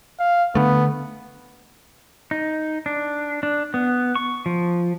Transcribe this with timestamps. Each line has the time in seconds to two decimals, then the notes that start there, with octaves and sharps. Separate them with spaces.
0.20 F5
0.55 D3 A3 B3
2.31 D#4
2.86 D4
3.43 D4
3.74 B3
4.15 C#6
4.46 F3